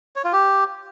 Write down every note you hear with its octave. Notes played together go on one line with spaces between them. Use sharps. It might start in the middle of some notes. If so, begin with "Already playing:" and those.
C#5
F4
G4